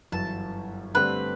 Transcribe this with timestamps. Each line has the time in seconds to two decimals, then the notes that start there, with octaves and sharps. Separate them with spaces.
0.12 G1 F#2 E3 A5
0.94 G2 D3 A3 C4 G4 B4